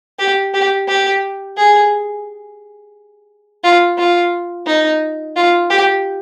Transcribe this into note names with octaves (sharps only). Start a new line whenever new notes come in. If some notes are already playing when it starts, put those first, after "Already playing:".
G4
G4
G4
G#4
F4
F4
D#4
F4
G4